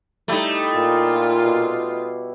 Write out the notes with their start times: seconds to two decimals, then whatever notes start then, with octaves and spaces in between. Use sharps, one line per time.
0.28 G3 A3 D#4 E4 G4
0.76 A#2 F4
1.44 B2